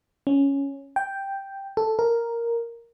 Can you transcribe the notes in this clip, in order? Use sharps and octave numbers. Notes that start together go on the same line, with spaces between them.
C#4
G5
A4
A#4